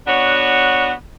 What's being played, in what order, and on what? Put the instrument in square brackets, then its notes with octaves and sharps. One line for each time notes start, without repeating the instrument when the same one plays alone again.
[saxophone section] B3 D4 F#4 C#5